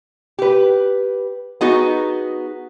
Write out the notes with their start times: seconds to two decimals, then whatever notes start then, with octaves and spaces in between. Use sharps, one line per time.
0.39 G4 B4
1.61 B3 D#4 F#4 G#4